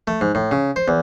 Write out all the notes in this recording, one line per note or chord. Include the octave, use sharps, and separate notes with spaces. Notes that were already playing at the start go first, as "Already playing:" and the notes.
A3
G#2
A2
C#3
C5
E2